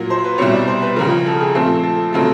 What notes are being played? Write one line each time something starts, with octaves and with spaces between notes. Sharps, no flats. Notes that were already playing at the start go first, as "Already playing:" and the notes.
Already playing: A#2 F#3 A#3
C5
B4
C2 B2 G3 C4 C#5
D5
C5
B4
C#2 C#3 F3 A#4
A4
G#4
A#2 F3 A3 C4 A4
A4
C#3 F#3 A3 C4 A4